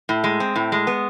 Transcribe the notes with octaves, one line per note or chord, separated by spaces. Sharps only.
A2
G#3
C4
A2
G#3
B3